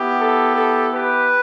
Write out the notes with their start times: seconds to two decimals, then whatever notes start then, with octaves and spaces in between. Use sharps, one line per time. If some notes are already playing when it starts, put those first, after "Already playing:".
Already playing: B3 E4 G4
0.20 A4
0.56 A4
0.94 G4 B4